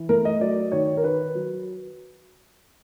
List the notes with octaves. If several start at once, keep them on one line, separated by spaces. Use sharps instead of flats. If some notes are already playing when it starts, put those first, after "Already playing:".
Already playing: E3
A3 A#4
D#5
F#3 D5
D#3 C#5
A#4
D#3 B4
F#3